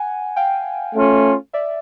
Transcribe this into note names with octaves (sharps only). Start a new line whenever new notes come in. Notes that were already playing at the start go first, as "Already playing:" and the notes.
Already playing: F#5 G#5
F5 G5
A3 C#4 F4
D5 E5